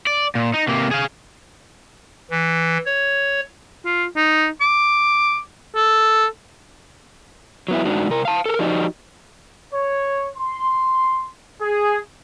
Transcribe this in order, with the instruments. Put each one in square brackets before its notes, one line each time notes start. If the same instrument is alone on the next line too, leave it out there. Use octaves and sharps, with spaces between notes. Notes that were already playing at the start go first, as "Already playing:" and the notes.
[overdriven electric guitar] D5
A#2
D#4
C3 A#3
G#4 F5
[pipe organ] E3
C#5
[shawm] F4
D#4
D6
A4
[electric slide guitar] F#3 B3 E4
G#2 G#3 D4 D#4 F#4
C3 A#4
F5 A5
A4 A#4
F3 D#4 F#4 G4 D5 D#5
[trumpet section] C#5
C6
G#4